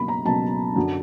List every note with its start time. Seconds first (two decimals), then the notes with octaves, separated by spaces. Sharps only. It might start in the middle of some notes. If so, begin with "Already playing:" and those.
Already playing: C#2 B2 F#3 A#3 B5
0.08 A#5
0.25 C#2 B2 F#3 A#3 A5
0.76 F#2 D3 F#3